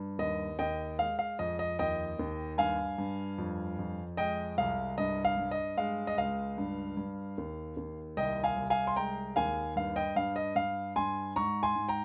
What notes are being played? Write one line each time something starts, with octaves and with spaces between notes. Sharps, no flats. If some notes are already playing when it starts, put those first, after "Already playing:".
Already playing: G2
D#2 D#5
D#2 D#5 G5
G#3 F5
F5
F2 D#5
D#5
D#2 D#5 G5
D#2
G2 F5 G#5
G2
F2
F2
G#3 D#5 G5
C2 F5
G2 D#5
F5
G2
D#5
G#3 F5
D#5
C#2 F5
G2
G2
D#2
D#2
C2 D#5 G5
F5 G#5
C2
F5 G#5
C6
G#3 G5 A#5
D#2 F5 G#5
G2 F5
D#5 G5
G2 F5
D#5
G2 F5
G2 G#5 C6
G#2 A#5 C#6
G#5 C6
G#2
G5 A#5